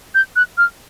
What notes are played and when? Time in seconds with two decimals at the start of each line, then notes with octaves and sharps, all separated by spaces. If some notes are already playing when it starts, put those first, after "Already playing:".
0.14 G6
0.36 F#6
0.57 F6